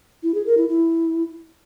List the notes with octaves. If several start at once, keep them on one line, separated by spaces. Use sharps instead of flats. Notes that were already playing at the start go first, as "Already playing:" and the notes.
E4
G#4
A#4
E4
E4